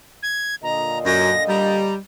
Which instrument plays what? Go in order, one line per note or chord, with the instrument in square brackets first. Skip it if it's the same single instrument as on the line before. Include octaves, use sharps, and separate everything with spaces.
[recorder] G#6
[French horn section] A#2 D3 D#5 [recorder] A#5
[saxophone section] F#2 [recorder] A#6
[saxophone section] G3 [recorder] A#5